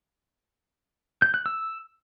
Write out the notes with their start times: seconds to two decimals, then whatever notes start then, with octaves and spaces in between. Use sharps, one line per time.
1.22 G6
1.34 F#6
1.46 E6